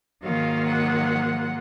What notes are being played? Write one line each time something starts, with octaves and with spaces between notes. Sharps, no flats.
G#2 D#3 F#3 A#3 F4 F5
F#5